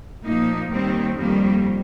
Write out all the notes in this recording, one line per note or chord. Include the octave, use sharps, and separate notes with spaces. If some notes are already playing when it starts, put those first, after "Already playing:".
A#2 F3 A#3 D#4
D#2 D#3 G3 C4
F2 D#3 G3 A#3